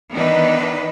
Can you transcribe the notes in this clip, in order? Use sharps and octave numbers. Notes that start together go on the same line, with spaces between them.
D#3 E3 B3 D4 D#4 B4